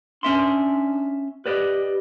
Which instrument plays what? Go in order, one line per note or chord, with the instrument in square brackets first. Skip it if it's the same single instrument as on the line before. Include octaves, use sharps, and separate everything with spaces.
[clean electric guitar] C#4 E5 C6 [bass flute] D4
[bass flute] G4 [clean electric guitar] B4 D5 D#5